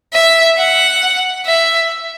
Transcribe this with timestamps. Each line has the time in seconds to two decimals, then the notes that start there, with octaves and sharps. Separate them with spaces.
0.13 E5
0.57 F#5
1.46 E5